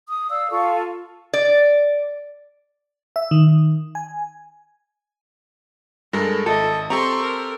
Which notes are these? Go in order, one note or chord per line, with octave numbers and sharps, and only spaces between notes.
D#6
D5 F5 E6
F4 A4 F5 C#6
D5
E5
D#3
G#5
G2 G#3 A4 A#4
G#1 A4 D#5 E5
C4 G4 A4 A#5 C6 C#6
A#4